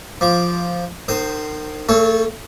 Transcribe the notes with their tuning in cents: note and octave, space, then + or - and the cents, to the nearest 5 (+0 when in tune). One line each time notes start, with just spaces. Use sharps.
F3 +0 D6 +0
D#3 -35 C5 +0 D#6 +0
A3 +40 A4 -25 C#5 +0